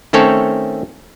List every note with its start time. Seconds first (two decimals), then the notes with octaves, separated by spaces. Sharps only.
0.13 D#3 A3 C4 C#4 A4 C#5